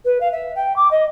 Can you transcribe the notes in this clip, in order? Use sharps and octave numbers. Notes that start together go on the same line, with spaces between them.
B4
F5
E5
G5
D6
D#5